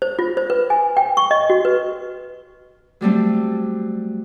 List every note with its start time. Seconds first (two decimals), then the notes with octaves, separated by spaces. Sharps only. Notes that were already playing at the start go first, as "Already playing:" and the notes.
0.02 C5
0.19 F4
0.37 C5
0.50 B4
0.70 G#5
0.97 G5
1.17 C#6
1.31 D#5
1.50 F#4
1.65 B4
3.01 F#3 G3 A3 C4